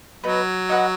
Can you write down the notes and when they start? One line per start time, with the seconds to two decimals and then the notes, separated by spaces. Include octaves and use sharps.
0.24 F#3 B3 D#4 B4
0.69 D#4 F#4 B4 F#5